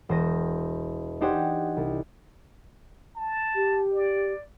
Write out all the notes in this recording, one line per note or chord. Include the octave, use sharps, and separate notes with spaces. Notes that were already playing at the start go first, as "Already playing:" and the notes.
E1 C5 A#6 D#7
D4 D#4 G4 C5 F#5 G#5
C2
A5
G4
D5